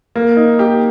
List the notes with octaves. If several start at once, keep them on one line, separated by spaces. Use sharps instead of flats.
A#3
D#4
G4